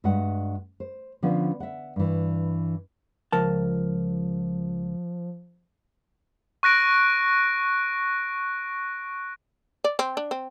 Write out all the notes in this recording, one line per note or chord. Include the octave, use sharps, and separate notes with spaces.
G2 G#3 F#4 E5 F#5
C5
D3 F3 B3 C#4 F4
E5 F#5
G2 E3
C#2 F3 A#4 A5
C#6 F#6 A#6 D7
D5
C4
D4
C4